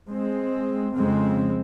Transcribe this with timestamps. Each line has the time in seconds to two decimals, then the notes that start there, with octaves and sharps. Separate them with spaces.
0.09 G#3 C4
0.96 F2 C#3 G#3 C4